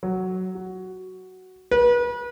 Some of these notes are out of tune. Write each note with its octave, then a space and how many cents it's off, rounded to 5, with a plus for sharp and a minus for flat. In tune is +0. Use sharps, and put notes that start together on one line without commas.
F#3 +5
F#4 +5
B4 -35